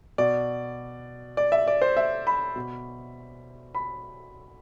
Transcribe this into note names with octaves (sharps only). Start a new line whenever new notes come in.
B2 D5
D5
E5
D5
C5
E5
B5
B2
B5